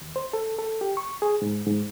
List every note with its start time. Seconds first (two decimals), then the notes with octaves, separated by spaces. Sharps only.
0.01 D#2
0.16 C5
0.33 A4
0.59 A4
0.81 G4
0.97 C#6
1.22 G#4
1.42 G#2
1.66 G#2